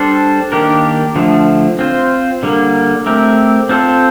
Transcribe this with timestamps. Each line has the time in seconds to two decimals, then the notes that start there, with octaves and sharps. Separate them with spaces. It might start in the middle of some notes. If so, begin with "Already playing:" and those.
Already playing: G3 D4 A4 C5
0.52 D#3 A#3 D4 G4 A#4
1.16 D3 F3 A3
1.79 C4 F4 C5
2.43 D3 G3 A#3
3.06 A3 C4 G4 A#4
3.69 C4 F4 A4 C5